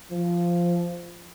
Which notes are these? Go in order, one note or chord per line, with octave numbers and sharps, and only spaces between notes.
F3